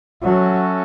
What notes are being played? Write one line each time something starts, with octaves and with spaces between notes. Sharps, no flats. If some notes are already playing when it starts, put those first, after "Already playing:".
F#3 C#4 F#4 A4 E5